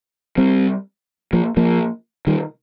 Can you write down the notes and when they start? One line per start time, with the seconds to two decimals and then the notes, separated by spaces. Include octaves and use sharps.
0.38 G3 C4
1.33 F3 A#3
1.57 F3 A#3
2.27 D#3 G3